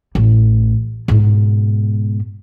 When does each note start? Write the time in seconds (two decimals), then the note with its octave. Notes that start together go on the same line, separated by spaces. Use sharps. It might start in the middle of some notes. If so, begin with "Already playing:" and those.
0.15 A1
1.08 G#2 B2